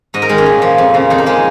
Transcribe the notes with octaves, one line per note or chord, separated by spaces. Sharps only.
G#2 D#5
A#4
D#3 G#3
C#4
A#2
F3
F2
C#3 F3
F2 D#4
A#3
F3 G#3